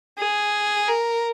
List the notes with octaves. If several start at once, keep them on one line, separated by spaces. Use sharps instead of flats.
G#4
A#4